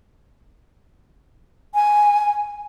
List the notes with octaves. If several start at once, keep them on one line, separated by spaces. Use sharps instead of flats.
G#5